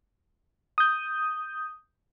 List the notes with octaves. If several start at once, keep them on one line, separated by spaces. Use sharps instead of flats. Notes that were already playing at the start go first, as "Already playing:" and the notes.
D#6 G6